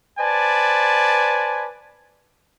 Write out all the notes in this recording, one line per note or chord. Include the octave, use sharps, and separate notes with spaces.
B4 C5 D5 G#5 A5